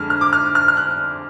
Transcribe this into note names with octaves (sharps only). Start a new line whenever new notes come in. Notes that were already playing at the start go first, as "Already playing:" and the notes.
Already playing: F2 D3 G#3 F6
F6
D6
F6
F6
F6
F#6